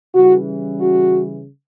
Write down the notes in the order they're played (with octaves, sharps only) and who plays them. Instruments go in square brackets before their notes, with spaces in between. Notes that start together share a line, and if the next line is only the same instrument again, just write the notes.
[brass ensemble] C#3 E3 G3 F#4
F#4